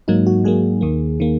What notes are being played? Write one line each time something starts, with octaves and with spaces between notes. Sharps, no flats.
G#2 F#3 A#3 D#4
F#4
G#2 F#3 A#3 G#4
D#2 D#3 A#3
D#3 A#3